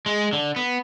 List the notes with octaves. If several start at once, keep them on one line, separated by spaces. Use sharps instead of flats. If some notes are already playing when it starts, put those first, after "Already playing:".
G#3
D3
B3